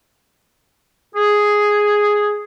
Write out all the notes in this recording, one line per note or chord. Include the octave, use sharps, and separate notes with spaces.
G#4